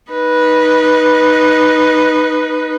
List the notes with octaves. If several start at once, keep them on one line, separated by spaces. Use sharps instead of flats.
D#4 B4